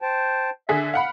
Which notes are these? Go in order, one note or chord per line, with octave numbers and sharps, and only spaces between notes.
C5 G5 A5
D3 G#4 E5 B6
F5 F#5 B5